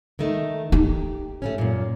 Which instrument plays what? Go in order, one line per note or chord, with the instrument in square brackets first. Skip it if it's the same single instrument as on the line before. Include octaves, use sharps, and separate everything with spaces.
[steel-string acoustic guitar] D#3 A3 D#4
[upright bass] D#4 [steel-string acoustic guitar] G4
[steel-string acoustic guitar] A3 B3 C#4
F#2 A#2